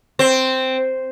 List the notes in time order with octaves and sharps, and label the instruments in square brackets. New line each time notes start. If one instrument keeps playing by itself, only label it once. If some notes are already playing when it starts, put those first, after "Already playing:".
[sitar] C4